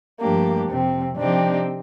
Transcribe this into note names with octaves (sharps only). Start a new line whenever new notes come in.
G2 F3 A3 A#3 D4 G4
F2 C3 F3 C4
C3 F3 C4 D4 D#4 G4